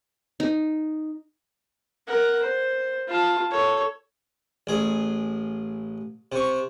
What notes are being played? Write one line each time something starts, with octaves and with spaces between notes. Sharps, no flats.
D#4
A#4 F#5
C5
F4 A5
A4 C#5
A1 G#4
C3 C#6